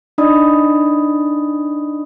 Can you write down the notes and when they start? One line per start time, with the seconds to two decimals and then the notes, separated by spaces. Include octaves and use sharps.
0.18 D4 D#4 D5 D#5 B5 D#6